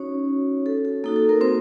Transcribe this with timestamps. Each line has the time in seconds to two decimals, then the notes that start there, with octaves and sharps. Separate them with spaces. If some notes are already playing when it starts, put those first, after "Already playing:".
Already playing: C#4 D#4 F#4 C#5
0.66 A4
0.85 A4
1.04 A#3 D#4 F#4 A4
1.16 A4
1.29 A#3 A#4
1.41 C4 C5